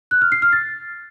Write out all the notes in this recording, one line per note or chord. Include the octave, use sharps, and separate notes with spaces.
F#6
F6
C7
F6
A6